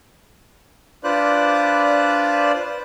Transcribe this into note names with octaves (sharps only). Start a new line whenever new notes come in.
D4 F4 B4 C5 D5 F#6